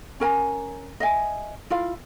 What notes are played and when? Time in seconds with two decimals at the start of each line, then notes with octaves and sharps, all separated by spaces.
0.20 C#4 A#4 G#5 A#5
1.00 D#5 E5 G#5
1.70 E4 F4 F5